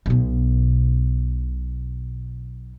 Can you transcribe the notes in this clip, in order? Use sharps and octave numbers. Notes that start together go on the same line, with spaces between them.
B1 B2